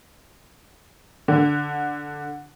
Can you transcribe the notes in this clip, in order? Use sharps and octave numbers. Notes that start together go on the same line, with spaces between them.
D3